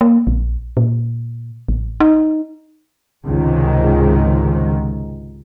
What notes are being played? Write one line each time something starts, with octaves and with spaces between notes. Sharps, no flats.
A#3
A#1
A#2
A1
D#4
C#2 G#2 C3 D#3 G#3